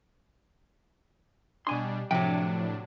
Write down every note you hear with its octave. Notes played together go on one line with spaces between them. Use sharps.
B2 G3 D4 G#5 C6
A2 C3 F3 F#3 D4 G5